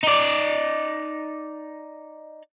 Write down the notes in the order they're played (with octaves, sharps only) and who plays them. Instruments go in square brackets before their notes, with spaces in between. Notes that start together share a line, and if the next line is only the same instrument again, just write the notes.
[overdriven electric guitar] D#4 D5